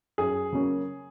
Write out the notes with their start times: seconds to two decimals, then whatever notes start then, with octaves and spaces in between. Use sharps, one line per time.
0.18 F#2 G#4
0.53 C#3 F#3 A#3 C#4